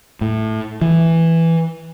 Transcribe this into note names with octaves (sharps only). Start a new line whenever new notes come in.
A2
E3